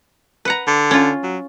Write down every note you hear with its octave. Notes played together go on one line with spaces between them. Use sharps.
B4 F#5 A#5
D3
C#4 F4
F#3